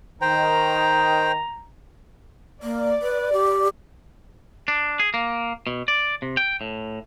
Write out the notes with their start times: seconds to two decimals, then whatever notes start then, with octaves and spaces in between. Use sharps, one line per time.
0.22 D#3 C5 G5 A#5
2.63 A#3 D5
3.02 B4
3.33 G4
4.68 D4
5.00 G#4
5.14 A#3
5.67 B2
5.88 D5
6.22 C3
6.37 G5
6.61 A2